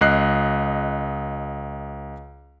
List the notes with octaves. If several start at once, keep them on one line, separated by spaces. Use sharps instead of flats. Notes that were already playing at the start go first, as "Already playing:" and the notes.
C#2 D#5 F#6 C7